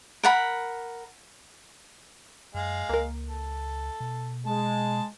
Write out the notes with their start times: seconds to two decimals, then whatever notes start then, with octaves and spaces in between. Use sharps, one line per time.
0.24 A#4 F#5 B5
2.54 F#2 G#3 F5
2.89 C#2 A#3 A#4
3.27 A4
4.00 B2
4.46 G#3 A5